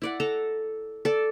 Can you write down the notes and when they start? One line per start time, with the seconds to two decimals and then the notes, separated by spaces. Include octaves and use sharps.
0.02 E4 D5 F#5
0.20 A4 A#5
1.05 A4 D5